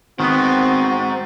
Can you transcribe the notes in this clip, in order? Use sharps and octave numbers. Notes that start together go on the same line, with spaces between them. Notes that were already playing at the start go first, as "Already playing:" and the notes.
D#3 G#3 B3 C4 F#4 C5